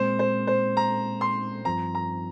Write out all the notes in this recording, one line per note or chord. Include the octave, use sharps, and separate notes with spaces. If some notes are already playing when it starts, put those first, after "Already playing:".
Already playing: A#2 G#3 C4 C5
C5
C5
A#5
C6
G2 F3 C4 A#5
A#5